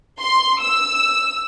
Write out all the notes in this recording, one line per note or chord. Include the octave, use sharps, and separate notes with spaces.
C6
E6